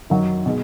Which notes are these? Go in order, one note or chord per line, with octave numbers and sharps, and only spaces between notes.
F#2 D#3 F#3
B2 G#3